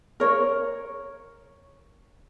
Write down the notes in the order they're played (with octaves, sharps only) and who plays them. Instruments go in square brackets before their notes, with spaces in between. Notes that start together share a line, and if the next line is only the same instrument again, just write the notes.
[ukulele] A#4 C#5